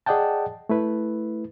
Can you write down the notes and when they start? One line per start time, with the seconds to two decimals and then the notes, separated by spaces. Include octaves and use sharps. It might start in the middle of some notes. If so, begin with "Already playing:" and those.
0.06 G#4 D5 D#5 F#5 G5 A5
0.69 A3 E4 B4